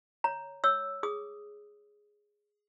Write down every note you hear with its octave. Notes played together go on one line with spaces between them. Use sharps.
C#5 A#5
C#5 E6
G#4 D#6